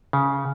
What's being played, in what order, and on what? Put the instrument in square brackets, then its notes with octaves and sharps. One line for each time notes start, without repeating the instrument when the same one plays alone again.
[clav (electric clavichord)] C#3